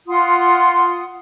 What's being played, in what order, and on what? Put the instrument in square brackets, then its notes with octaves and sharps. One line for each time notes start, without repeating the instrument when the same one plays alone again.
[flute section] F4 F#5 C6 D#6